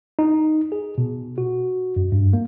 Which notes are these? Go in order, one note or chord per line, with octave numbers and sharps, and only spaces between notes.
D#4
G#4
B2
F#4
F#2
G2
A#3